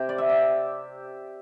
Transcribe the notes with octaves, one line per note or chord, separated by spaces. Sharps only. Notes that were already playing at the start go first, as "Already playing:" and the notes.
Already playing: C3 G4
D5
E5
D5